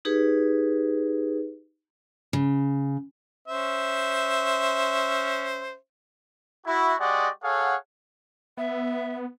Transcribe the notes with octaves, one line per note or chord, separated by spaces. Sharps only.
D#4 G4 G#4 B4
C#3
C#4 C5 E5
E4 F#4
G#3 F#4 G4 D5 D#5 F#5
G#4 A4 C#5 F5 F#5
B3 E5